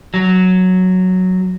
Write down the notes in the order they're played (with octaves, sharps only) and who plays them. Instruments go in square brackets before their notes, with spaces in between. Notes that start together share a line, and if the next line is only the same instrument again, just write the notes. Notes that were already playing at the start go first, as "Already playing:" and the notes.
[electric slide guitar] F#3